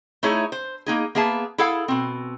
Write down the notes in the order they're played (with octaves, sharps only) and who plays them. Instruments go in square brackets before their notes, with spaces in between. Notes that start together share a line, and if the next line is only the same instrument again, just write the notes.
[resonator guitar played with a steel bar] A3 D#4 E4 G#4 C#5
C5
A#3 D#4 G#4
A#3 B3 G#4 E5 A5
E4 G#4 A4 F5 F#5
B2 C4